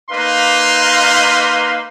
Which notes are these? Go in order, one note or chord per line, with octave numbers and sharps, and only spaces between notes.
A#3 D#4 B4 F5 C6